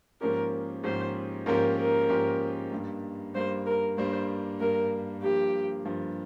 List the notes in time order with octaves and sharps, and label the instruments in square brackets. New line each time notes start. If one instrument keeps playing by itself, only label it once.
[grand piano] G#2 F3 A#3 C#4 G4 [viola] A#4
[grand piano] G#2 F3 A#3 C#4 G4 [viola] C5
[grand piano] G#2 F3 A#3 C#4 G4 [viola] A#4
[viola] A#4
[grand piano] G#2 F3 A#3 C#4 G4
G2 G3 A#3
[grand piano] G2 G3 A#3 [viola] C5
[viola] A#4
[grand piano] G2 G3 A#3 [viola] C5
[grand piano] G2 G3 A#3 [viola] A#4
[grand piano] G2 F3 A#3 [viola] G4
[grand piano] G2 F3 A#3